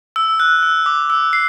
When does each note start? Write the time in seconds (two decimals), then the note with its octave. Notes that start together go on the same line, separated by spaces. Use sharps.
0.16 E6
0.40 F#6
0.63 E6
0.86 D6
1.10 E6
1.33 C7